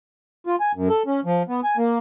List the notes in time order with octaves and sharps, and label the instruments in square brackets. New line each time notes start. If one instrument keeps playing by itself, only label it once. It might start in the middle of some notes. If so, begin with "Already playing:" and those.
[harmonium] F4
G#5
F#2
A4
C#4
F3
B3
G#5
A#3